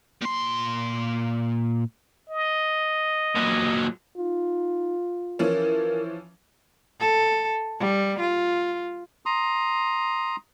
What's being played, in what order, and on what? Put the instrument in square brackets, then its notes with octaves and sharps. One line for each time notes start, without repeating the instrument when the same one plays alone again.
[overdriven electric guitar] A#2 C6
[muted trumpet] D#5
[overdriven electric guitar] A#2 F#3
[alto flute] D#4 [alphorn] F4
[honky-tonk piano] E3 F3 C#4 [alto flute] A#4
[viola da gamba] A4
G3
F4
[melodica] A#5 C6 D#6